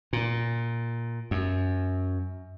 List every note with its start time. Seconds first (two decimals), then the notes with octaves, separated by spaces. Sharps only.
0.13 A#2
1.31 F#2